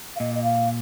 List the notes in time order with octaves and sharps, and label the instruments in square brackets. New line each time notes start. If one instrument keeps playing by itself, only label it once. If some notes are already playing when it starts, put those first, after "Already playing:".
[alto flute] F5
[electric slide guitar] A#2 [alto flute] D#5
[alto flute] D#5
F5